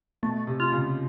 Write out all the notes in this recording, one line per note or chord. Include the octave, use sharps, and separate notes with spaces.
B2 A3
C3
F4
C#3